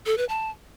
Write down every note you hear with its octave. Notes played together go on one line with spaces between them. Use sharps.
A4
B4
A5